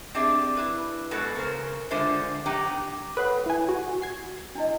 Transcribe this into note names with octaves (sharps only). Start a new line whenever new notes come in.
C4 D4 G4 G#4 E5
E4 B4
B2 G#3 F#4 A4 B4
C#3 A#4 C5
D3 G#3 D4 F4 C5 E5
F#3 D#4 G4 G5
A4 B4 C#5 F#5 F#6
E4 G#5
F#4
G#6 C7
D4 E4 D#5